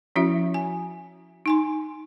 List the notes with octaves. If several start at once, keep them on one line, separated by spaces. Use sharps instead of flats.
F3 C#4 E4 F#4 E5
G#5
D#4 G#5 C6